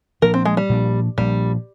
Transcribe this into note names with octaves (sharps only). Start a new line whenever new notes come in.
A#2 F3 A#3 D4 A#4
C4
G#3
G3
A#2 F3 A#3 D4
A#2 F3 G3 A#3 D4